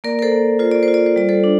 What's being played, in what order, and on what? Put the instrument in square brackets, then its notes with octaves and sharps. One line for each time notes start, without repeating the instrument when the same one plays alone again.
[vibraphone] A#3 A#4 D5
A#4
A4 C5
A#3
F4 C5
D5
C5
F4
D5
C5
G3 D5
A4 C5
D4